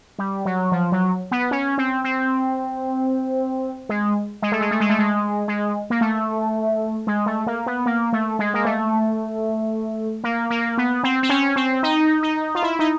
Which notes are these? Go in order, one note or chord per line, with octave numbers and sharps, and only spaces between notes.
G3
F#3
F3
F#3
B3
C#4
C4
C4
G#3
G#3
A3
G#3
A3
G#3
A3
G#3
G#3
A#3
A3
G#3
A3
A#3
B3
A#3
A3
G#3
A#3
A3
A#3
A#3
B3
C4
C4
C#4
C4
D#4
D#4
F4
E4
D#4